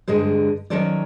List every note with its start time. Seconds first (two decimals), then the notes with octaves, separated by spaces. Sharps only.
0.08 G2 D3 G#3 G#4 C5
0.70 D#3 F#3 C#4 A4 C5 D5